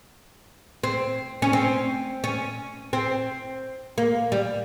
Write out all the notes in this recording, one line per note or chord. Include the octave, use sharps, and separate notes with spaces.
C4
C#4
C4
C#4
C4
A#3
G3